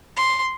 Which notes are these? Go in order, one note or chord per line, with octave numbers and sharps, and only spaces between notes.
C6